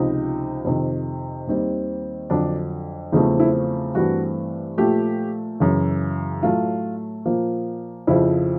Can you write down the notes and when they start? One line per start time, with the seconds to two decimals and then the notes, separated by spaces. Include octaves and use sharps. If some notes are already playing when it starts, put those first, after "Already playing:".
Already playing: C#2 C3 F3 D#4
0.65 F2 C3 D#3
1.47 D#2 D#3 G3 C4
2.30 F2 D3 F#3 D4
3.12 E2 C#3 F3 A3 C4 D#4
3.40 E4
3.95 G2 E3 A3 C4 F#4
4.78 A#2 F3 A3 G4
5.60 F#2 C#3 E3
6.43 A2 F#3 A3 F4
7.26 A#2 F3 A#3
8.07 F2 C#3 F3 E4